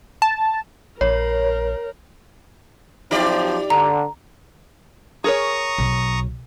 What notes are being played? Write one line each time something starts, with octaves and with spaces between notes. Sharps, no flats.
A5
A#1 A#4 C#5
F3 F#3 C4 D#4 G4 D5
D3 A#5
G#4 A#4 C#5 A#5 C#6 D#6
B1